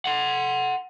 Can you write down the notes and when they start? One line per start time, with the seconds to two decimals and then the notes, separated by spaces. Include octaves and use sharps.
0.06 F#5 C6